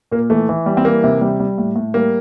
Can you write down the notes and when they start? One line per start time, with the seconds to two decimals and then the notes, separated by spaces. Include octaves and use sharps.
0.12 A#2 A#3
0.30 E3 A3
0.49 E3
0.66 G3
0.77 C4
0.85 E3 A#3
1.04 C3
1.21 G3
1.40 G3
1.58 A2
1.76 A2
1.94 G3 A#3